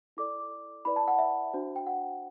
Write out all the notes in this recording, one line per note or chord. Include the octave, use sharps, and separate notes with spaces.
E4 A4 D5 D6
E4 B4 D5 B5
A5
F#5
E5
D4 F#4 C5
G5
F#5